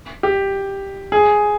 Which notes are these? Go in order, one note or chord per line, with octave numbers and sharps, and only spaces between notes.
G4
G#4